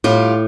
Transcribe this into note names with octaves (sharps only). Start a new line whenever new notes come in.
A2 G3 F4